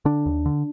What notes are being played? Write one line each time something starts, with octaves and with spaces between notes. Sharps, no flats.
D3 D4
D#2
D3